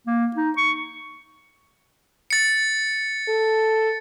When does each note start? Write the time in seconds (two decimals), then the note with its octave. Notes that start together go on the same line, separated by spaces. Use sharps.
0.07 A#3
0.36 D#4
0.57 C#6
2.30 A6 C#7
3.28 A4